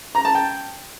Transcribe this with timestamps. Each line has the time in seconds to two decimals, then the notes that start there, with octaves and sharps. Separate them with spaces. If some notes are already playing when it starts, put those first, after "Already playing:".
0.15 A#5
0.25 A5
0.35 G5